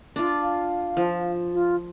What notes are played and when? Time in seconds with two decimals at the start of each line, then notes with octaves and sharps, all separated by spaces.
0.16 D4 F4
0.42 F5
0.97 F3
1.53 F4